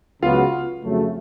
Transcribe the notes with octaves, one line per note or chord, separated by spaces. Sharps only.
C#2 C#3 F#3 B3 F4 F#4 F5
F2 C#3 F#3 A3